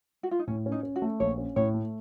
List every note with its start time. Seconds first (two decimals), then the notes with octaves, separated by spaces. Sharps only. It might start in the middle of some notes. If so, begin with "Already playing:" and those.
0.23 F#4
0.31 F4
0.39 D#4
0.47 A2 C#4
0.66 C#4
0.72 D#4
0.83 C#4
0.96 F#4
1.02 A3
1.20 A#1 C#5
1.38 C#4
1.56 A2 C#5
1.74 A3